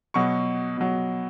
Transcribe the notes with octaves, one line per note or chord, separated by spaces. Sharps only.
B2 F#3 C#6
B2 F#3